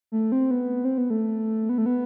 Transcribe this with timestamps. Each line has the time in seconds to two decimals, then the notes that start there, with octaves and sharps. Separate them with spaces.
0.12 A3
0.32 C4
0.51 B3
0.85 C4
0.98 B3
1.10 A3
1.69 B3
1.78 A3
1.86 B3